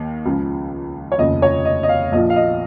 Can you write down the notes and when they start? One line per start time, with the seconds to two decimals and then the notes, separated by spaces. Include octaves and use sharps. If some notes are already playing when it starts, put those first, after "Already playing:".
Already playing: D#2 D#3
0.25 C#2 C#3 F3
1.12 C#5
1.18 F1 D#2 C#3 F3 D#5
1.42 C#5
1.65 D#5
1.83 D#5
1.89 F5
2.12 A#1 A#2 F3 D#5
2.30 F5
2.36 D#5